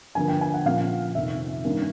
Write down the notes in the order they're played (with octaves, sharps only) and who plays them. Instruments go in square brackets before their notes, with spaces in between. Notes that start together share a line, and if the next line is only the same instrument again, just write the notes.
[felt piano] G2 D3 F3 A#3 G#5
G5
G#5
F#5
A#2 F3 A#3 C#4 F5
F2 C3 D#3 E5
G2 D#3 G3 A#3 C#4